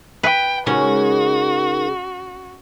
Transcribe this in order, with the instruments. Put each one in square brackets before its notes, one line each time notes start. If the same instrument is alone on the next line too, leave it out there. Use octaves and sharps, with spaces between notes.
[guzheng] B4 [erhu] G5
[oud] C#3 G#3 [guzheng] C#4 [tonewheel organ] D#4 G#4 A#4 [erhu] F#4